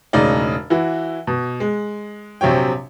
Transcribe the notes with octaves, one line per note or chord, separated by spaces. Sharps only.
E1 A2 C#3 D#4 D5
E3 E4 F#4
B2
G#3
A#1 C3 F#3 C#5 G5